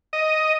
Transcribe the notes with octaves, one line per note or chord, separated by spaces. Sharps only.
D#5